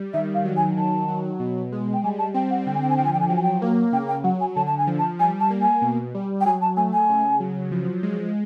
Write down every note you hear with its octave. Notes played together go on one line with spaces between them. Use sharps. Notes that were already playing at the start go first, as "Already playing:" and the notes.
Already playing: G3
D#3 E5
F5
F#3
G#5
D#3 A5
F#3
B2
G#3
G5
G3 G#5
A5
C4 G5
F#5
D3 G5
G#5
G5
G#5
F3 G5
G#5
G5
G#5
F#3 G5
G#5
G5
A#3
C#3 G5
G5
F#3 F#5
G#5
D3 A5
A5
G#5
F3
A5
G3 G#5
A5
A#3
G#5
B2
G3
G5
F#3 G#5
A5
A3 G#5
G#5
C#3
F#3
F3
G#3